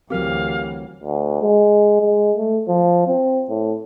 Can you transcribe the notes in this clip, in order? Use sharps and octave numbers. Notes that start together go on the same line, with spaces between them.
D2 E3 F#3 C4 G4 A#4 F5
D2
G#3
G#3
A3
F3
C4
A2